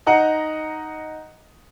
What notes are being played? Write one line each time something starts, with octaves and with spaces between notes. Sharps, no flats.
D#4 D#5 F#5 A#5